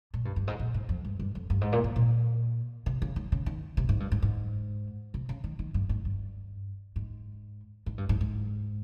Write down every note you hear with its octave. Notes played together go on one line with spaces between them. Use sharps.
A#2
G2
G2
G#2
A#2
G#2
F2
G2
G2
F2
G2
G#2
A#2
G#2
A#2
C3
C#3
D#3
C#3
D#3
C3
G#2
G2
G#2
G#2
C3
C#3
D#3
D#3
G2
G#2
G2
G#2
G#2
G2
G#2
G#2